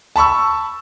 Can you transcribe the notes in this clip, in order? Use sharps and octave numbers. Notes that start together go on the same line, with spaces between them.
A5 B5 C#6 E6